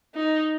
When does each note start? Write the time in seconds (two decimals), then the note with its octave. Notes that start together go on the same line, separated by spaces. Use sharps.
0.15 D#4